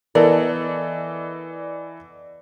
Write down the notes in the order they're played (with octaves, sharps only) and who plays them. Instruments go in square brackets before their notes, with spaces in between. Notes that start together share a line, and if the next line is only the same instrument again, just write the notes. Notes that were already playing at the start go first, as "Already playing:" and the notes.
[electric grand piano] E3 B3 A4 [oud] A#4 [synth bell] D5 D#5